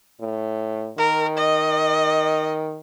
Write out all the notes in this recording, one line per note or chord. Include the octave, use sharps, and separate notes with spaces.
A2
D#3 A#4
D#5